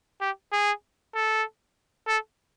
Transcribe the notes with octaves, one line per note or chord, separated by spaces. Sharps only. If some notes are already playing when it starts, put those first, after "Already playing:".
G4
G#4
A4
A4